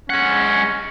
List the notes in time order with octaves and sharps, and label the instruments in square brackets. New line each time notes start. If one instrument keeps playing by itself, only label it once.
[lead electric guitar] G#3 F#5 [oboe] C#4